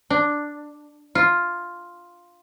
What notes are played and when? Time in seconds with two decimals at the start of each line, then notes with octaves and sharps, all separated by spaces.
0.10 D4
1.15 F4